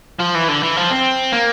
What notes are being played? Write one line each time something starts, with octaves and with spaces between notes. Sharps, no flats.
F3
E3
D3
E3
F3
C4
A#3